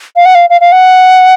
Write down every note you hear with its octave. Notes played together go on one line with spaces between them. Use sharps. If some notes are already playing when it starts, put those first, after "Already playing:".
F5
F#5
F5
F5
F5
F#5